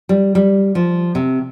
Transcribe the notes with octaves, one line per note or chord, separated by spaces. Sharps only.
G3
G3
F3
C3